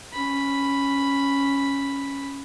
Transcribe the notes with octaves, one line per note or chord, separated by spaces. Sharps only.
C#4 B5